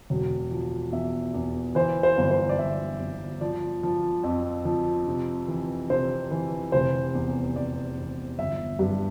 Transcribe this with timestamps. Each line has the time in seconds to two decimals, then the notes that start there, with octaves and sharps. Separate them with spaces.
0.10 E1
0.51 F3
0.92 E2 E5
1.34 E2
1.75 E3 C5
2.03 C5
2.17 G1
2.31 C5
2.49 D5
2.58 G1 E5
3.00 G1
3.41 F3 D5
3.83 F3
4.24 F2
4.65 F3
5.08 C3
5.48 E3
5.90 C3 C5
6.31 E3
6.72 F1 C5
7.15 E2
7.56 E2 D5
7.98 E2
8.38 G1 E5
8.79 G2